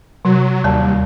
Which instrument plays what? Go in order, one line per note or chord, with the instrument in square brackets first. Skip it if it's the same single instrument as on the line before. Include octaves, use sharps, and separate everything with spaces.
[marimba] C3 [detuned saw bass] F#3
[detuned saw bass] D#2 [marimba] G3 D5 A5